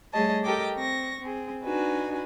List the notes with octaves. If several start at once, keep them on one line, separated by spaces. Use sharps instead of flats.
G3 A3 G#4 C#5 D#5 A5
G4 A4 A#4 D#5 G5 D6
C4 C#6 A#6
C4 G#4
D4 D#4 F#4 B4 G#5